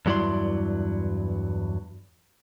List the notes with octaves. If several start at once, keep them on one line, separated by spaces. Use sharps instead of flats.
E2 G2 F#3 E4 D5 C6